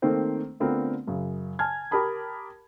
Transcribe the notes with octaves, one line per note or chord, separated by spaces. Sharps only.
D#3 A3 A#3 C4 C5
D3 A3 B3 C4 F4 A#4
F#2 C#3
G#5 A5 F6 G#6
G4 A#4 A5 B5 D#6